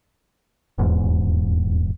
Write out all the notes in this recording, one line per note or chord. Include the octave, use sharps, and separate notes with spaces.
D#1 E2 G#2